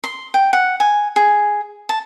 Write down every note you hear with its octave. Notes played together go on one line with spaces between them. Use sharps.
C6
G5
F#5
G#5
G#4
A5